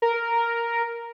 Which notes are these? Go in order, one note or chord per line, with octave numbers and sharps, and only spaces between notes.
A#4